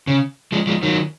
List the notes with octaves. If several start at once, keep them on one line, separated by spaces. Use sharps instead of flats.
C#3
F3 G#3
F3 G#3
D#3 F#3